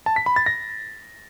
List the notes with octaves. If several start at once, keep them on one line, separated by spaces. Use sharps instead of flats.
A5
B6
B5
A6
A#6